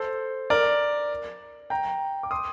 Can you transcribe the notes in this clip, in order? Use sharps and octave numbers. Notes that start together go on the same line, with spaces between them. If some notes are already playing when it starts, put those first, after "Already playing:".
Already playing: A4 C5
A#4 D5
G5 A#5
D6
C6 D#6